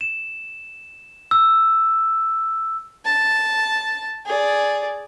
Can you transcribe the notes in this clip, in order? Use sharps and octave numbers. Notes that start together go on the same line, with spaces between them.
E7
E6
A5
G#4 D5